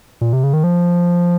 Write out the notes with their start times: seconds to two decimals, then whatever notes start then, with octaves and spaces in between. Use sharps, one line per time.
0.21 A#2
0.33 C3
0.43 C#3
0.53 D#3
0.64 F3